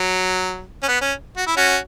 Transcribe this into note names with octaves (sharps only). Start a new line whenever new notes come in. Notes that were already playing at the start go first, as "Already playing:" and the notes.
Already playing: F#3
C#4
B3
C#4
F#4
E4
C#4 F#4